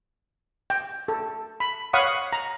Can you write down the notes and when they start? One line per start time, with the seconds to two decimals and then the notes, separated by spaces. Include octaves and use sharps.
0.70 G5
1.08 A4
1.60 B5
1.93 C#5 F5 F#5 B5 C#6 D#6
2.33 A#5